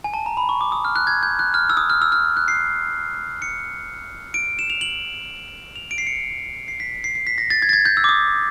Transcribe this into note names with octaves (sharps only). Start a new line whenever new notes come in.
G#5
A5
A#5
B5
C#6
D6
D#6
F6
F#6
G#6
G6
F#6
F6
E6
D#6
F6
E6
F6
F#6
C7
C#7
D7
E7
F7
F#7
F7
D7
C7
C#7
C7
B6
C7
C7
B6
A#6
A6
G#6
A6
G#6
G6
E6
D6
D#6